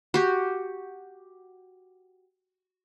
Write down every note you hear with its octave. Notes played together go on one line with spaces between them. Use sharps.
F#4 G4